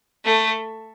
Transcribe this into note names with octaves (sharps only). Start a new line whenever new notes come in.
A3